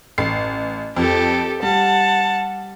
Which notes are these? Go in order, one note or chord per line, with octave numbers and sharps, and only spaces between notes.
A1 C7
F2 G4 A4
G3 F#5 A5